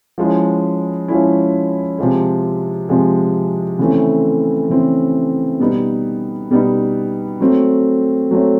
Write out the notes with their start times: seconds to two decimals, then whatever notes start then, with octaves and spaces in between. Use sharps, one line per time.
0.18 F3 G#3 C#4 E4
1.08 F3 G#3 C#4 E4
1.98 C3 F3 G#3
2.89 C3 F3 G#3
3.79 C#3 E3 A3 C4
4.69 C#3 E3 A3 C4
5.60 B2 G3 B3 D#4
6.50 B2 G3 B3 D#4
7.40 F#3 A3 C4
8.31 F#3 A3 C4